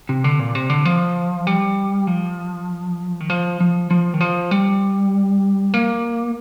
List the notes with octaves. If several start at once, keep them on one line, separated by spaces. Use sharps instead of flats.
C3
D3
A#2
C3
D3
F3
G3
F3
D#3
F3
F3
F3
D#3
F3
G3
A#3